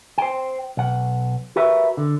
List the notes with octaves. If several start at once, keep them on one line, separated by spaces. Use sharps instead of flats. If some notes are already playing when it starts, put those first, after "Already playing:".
C5 G5
B1 F#5
F#4 G4 A#4 B4 E5
D3